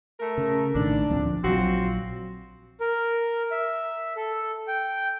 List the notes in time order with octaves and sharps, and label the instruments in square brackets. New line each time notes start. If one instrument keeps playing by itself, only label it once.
[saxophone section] A3 A#4
[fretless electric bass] C#3
[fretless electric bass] A#1 A2 D#3 [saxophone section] D4
[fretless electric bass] D2 F3 C4
[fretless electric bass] A#1 F#3 [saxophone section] C4 F4 F#4
[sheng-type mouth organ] A#4
E5
A4
G5